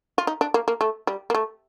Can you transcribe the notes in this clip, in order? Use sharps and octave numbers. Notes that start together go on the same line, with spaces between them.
F4
D#4
D4
A#3
A#3
A3
G3
A#3
A3